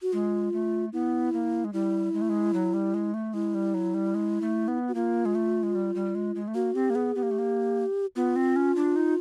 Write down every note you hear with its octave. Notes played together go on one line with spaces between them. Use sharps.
F#4
G#3 F4
A3
B3 E4
A#3
G#3
G3 E4
G#3
A3
G#3
F#3
G3
G#3
A3
G#3 E4
G3
F#3
G3
G#3
A3
B3
F#4
A#3 F4
G#3
A3
G#3
G3
G3
G#3
G#3
A3
A#3 F#4
C4 G4
A#3
B3 G#4
B3 G4
A#3
A3
A#3
B3 F4
C4
C#4
D4
D#4